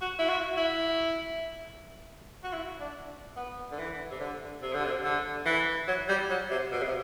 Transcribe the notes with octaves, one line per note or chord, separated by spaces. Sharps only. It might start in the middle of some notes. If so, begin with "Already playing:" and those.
F#4
E4
F#4
E4
F#4
E4
D4
B3
D3
E3
C3
D3
C3
D3
C3
D3
E3
F#3
G3
F#3
C3
B2
C3